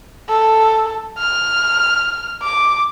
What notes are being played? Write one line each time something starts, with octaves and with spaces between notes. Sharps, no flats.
A4
F6
D6